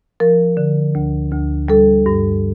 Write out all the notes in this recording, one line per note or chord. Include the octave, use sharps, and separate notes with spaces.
F3 A#4
D3
D2
D2
G3 A4
G2